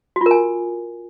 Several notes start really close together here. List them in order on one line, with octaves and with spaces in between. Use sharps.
F#4 F4 A#4 G#5